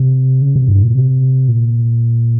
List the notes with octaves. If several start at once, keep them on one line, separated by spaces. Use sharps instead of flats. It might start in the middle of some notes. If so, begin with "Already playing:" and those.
Already playing: C3
C#3
C3
G2
A#2
C3
A#2